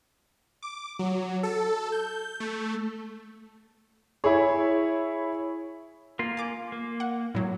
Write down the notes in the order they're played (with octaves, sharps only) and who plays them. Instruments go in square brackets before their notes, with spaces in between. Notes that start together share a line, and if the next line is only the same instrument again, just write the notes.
[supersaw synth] D6
F#3
A4
G6
A3
[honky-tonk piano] E4 C#5 [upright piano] G#4
[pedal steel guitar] A#3 F4
[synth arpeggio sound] G#5 D6
[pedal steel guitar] A#3
[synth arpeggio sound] F#5
A2 F#3